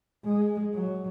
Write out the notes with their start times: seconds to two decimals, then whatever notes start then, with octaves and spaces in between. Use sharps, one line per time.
0.25 G#3
0.74 F#3